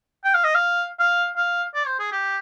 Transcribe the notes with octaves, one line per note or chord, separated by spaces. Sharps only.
G5
F5
D#5
F5
F5
F5
D5
C5
G#4
G4